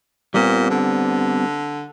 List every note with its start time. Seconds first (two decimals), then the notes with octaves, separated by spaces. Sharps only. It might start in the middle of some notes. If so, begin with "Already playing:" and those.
0.34 A#2 G3 B3 C4
0.70 D3